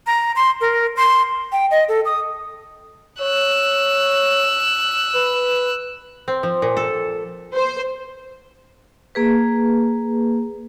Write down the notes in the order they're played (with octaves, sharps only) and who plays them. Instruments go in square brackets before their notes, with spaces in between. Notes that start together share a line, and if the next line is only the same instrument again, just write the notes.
[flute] A#5
C6
A#4
C6
[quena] G5
D#5
A4
D#6
[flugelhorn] C#5 [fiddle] E6 F#6
[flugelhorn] B4
[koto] C4
F3
A#2
A4
[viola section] C5
[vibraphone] A#3 G#4 B4